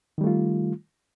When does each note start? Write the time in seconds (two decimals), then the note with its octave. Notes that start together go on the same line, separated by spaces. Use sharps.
0.18 D#3
0.21 G3
0.24 A3
0.27 F4